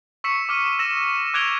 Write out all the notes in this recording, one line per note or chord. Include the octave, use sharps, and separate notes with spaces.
C#6 E6 B6 C#7 E7
D6 F6 C#7 D#7
E6 A#6 E7
D6 F#6 G#6 D7 F7 G7